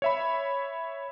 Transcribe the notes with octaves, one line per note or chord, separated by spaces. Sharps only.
C#5 E5 B5